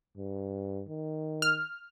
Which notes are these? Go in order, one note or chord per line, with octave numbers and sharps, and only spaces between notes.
G2
D#3
F6